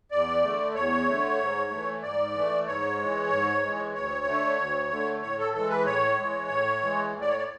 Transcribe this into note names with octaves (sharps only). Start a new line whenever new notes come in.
E2 D5
D3 A3
E2 C#5
D3 A3
G#2
E3 A3
G#2 D5
E3 A3
G#2 C#5
E3 G#3
G#2
E3 G#3
D2 C#5
D3 A3
D2
D3 A3
A2 C#5
A4
E3 G#3 A4
B4
A2 C#5
E3 G#3
A2
E3 G#3
A2
D5
C#5
D5